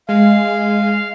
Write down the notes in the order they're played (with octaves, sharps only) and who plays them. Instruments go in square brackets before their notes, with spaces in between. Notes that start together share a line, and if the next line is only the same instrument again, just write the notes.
[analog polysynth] G#3 [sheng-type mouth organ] F5